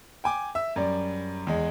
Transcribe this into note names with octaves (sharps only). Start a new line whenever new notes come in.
G5 G#5 D6
E5 E6
F#2 G3 D5
E2 G#3